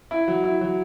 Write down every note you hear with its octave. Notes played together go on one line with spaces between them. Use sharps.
E4
F#3
E4
F#3